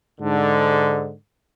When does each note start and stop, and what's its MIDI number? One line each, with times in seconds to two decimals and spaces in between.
0.19 1.11 44
0.19 1.11 50